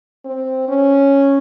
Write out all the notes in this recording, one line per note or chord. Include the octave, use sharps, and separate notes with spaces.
C4
C#4